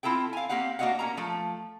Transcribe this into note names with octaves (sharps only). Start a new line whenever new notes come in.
C4 E4 F4 A4 G5
F5 G#5
A#3 C4 G4 F5 F#5
A#3 D4 F#4 D#5 F5 F#5
A#3 C#4 A#5
F3 A3